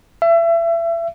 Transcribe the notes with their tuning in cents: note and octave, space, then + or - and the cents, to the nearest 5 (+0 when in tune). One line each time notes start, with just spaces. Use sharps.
E5 +30